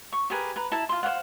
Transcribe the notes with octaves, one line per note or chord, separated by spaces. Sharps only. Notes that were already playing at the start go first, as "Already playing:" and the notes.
C#6
G4 G#4 A#4 B4
B4 A#5
E4 E5 A5 A#5
F4 C6
C5 C#5 F5 F#5